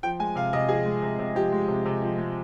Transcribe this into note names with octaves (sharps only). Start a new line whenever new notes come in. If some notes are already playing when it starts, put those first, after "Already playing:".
F3 G5
G#3 G#5
C3 F5
C3 D#5
F3 G#4
G#3
C3
C3
F3 G4
G#3
C3
C3
F3
G#3